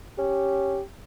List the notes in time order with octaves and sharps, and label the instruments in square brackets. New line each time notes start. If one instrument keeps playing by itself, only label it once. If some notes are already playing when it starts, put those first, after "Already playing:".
[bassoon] C#4 [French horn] G4